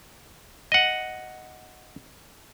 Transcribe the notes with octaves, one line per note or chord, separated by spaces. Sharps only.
D#5 F#5